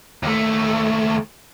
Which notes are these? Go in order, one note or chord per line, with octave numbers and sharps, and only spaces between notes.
D#2 A3